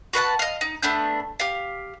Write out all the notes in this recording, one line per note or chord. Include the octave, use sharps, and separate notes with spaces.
F#4 B4 F#5 A5
D#5 F5
D#4
A3 B3 D4 G6
G4 F5